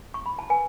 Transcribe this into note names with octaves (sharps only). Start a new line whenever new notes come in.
C#6
B5
A5
B4 G#5